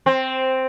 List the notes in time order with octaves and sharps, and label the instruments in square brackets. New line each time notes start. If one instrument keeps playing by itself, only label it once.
[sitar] C4